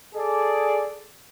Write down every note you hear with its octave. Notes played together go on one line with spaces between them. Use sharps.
G#4 A4 D5